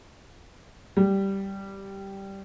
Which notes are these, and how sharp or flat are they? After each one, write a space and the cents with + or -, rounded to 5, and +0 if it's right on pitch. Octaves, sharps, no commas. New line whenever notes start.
G3 -5